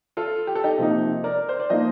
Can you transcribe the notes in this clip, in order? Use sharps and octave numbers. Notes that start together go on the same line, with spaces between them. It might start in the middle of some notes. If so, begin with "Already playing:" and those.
F4 A4
G4
A4
D#4 G4
C3 F3 A#3 D#4
A#4 D5
C5
D5
F3 A#3 D#4 C5 D#5